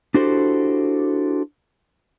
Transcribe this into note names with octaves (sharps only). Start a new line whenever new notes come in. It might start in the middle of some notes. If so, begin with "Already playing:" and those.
D4 E4 F#4 G4 A4 C5